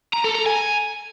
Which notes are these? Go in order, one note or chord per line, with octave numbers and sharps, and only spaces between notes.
A#5
A4
A#5
G#5